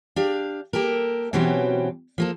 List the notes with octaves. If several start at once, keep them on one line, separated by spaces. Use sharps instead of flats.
D4 G4 F5
A#3 G4 A4 A#4
B2 E3 F#3 C4 C#4 G4
F3 A#3 A4